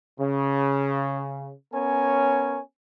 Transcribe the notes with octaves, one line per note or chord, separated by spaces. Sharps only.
C#3
B3 C#4 A#4 C#5 G#5